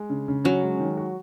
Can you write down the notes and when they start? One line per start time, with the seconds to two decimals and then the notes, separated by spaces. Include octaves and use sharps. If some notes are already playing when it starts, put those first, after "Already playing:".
Already playing: G#3
0.10 C#3
0.28 C#3
0.44 F#3 C#4
0.63 G#3
0.80 D#3
0.97 F#4